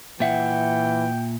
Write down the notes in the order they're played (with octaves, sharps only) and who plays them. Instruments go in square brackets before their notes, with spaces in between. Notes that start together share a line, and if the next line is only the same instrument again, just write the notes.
[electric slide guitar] A#2 E5 F#5 [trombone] E3 [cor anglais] G5